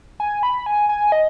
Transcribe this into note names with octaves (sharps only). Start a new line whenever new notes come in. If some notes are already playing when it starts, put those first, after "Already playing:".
G#5
B5
G#5
G#5
D#5